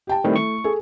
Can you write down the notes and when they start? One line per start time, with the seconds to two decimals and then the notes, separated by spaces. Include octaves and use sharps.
0.07 G4 G5 A5
0.24 D#3 G3 A3 C4 E4
0.36 C#6
0.64 G#4 A4